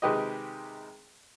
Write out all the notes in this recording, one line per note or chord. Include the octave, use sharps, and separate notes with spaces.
C3 D#3 G#3 G4 B4 D#5